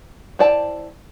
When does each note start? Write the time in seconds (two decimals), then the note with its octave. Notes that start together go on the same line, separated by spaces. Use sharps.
0.39 E4 C5 D5 G5 A5